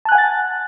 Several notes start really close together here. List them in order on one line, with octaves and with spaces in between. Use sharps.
A5 F#6 G#5 F#5 A6